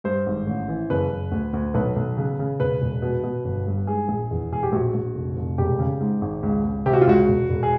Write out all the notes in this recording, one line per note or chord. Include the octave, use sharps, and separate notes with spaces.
G2 C5
G#1
A1
E3
F#1 B4
F#1
D2
D2
B1 B4
B1
C#3
C#3
E1 B4
E1
B2
B2
G1
G2
G#2 G#4
A#1
E2
E1 G#4
G4
A#1 F#4
A#1
F1
F1
E1 G4
C#3
G#2
G#1
C#2
C#2
C3 G4
F#4
F4
C#2 F#4
E1
E1
G#4